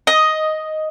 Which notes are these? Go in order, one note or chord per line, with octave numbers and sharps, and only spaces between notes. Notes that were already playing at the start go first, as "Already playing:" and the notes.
D#5